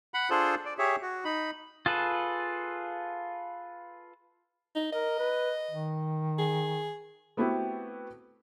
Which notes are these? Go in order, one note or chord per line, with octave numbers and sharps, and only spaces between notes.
F#5 B5
D4 F4 G#4 A4 C5
D5
G4 G#4 C#5 E5
F#4
D#4 B5
F4 G#4 A4 B4
D#4
A#4 D#5
B4
D#3
G#4
A3 B3 C4 E4 F#4 G4